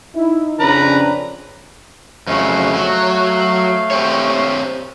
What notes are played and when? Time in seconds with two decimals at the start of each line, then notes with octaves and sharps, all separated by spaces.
0.15 D#4 E4
0.60 F2 C#3 C#4 D4 B4 A#5
2.27 F2 C#3 F#3 A3 F5
2.74 F#3
3.91 C4 G4 C#5